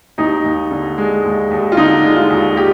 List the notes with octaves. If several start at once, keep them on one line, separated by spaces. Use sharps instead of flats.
D#2 D#4
D#2
D3
G#3
D#2
D#2
F4
D3 D#4
G#3
F4
D#2
G4